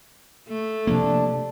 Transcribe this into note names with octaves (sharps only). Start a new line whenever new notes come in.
A3
C3 F3 A#3 D4